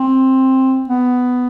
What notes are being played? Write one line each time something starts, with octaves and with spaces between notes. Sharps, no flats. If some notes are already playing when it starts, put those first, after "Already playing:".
Already playing: C4
B3